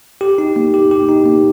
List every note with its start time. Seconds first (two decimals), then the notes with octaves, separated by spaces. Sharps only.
0.21 G4
0.38 D#4
0.56 A#3
0.74 G4
0.91 G4
1.09 D#4
1.26 A#3